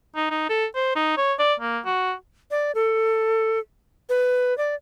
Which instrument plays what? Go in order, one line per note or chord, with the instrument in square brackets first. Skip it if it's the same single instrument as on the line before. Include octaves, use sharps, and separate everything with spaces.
[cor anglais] D#4
D#4
A4
C5
D#4
C#5
D5
A#3
F#4
[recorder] D5
A4
B4
D5